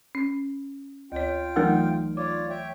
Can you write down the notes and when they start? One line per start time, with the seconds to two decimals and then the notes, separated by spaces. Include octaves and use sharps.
0.15 C#4
1.12 D2 F4 C#5 G5
1.56 E3 F#3 A3 D#4 A#4 F#5
2.17 F4 C#5 D5 D6
2.50 C#5 E5 G5